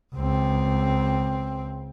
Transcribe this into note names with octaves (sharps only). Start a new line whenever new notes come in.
C#2 C4